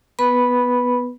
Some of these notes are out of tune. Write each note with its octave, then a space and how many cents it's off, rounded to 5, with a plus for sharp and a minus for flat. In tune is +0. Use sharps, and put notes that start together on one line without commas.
B3 +0 B4 -5 B5 -5